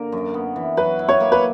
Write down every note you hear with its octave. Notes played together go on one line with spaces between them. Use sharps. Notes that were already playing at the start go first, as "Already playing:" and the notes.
Already playing: D3 A#3 A#4
F#2
B3
E3
F#3 B4
E4
C#5
A#3
B4